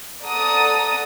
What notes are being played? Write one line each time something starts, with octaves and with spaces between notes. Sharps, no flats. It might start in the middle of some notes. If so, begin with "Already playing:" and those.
A4 D5 F#5 A5 A#5 D#6